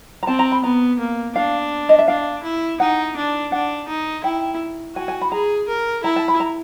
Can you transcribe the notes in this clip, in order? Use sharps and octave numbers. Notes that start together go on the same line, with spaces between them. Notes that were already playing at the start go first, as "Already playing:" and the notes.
A#5
C4 A5
A#5
B5
B3 A#5
A#3
D4 F5
D#5
E5
D4 F5
E4
D#4 F#5
D4
D4 F#5
D#4
E4 G5
F#4 G#5
G#5
B5
G#4 A#5
A#4
E4 A#5
A5
B5
A#5